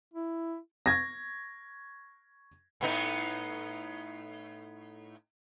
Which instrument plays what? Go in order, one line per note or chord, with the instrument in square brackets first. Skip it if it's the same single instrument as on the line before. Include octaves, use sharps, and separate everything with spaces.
[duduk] E4
[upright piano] C#6 G#6 A#6
[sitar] A2 B3 D#4